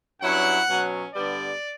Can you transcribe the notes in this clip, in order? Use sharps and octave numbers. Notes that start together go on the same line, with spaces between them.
G2 F#3 C#4 E4 F#5
B2 F#3 C#4
G2 D3 G3 B3 D5